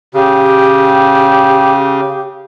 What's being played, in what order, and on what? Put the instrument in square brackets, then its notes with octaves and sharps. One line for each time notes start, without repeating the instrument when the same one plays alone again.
[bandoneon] C#3 [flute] G4